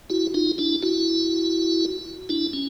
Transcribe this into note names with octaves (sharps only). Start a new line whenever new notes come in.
E4 F#4
D#4 F4
D4 E4
E4 F#4
D4 E4
C#4